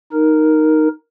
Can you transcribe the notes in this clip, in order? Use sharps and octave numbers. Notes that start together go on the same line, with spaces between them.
D#4 A#4